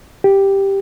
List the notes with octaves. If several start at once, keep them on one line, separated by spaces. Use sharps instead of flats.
G4